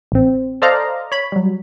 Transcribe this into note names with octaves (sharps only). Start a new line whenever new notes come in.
A1 C4
A4 C5 D5 D#5 F5 A#5
C#5 B5
F#3 G3